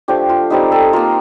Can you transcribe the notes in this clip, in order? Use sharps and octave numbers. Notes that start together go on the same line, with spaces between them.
F3 A3 D4 G4
F4
G3 C4 D#4 G4
A4
A#3 F4 A#4